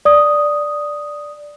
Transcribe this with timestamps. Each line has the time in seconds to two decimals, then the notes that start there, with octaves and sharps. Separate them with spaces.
0.05 D5 D#6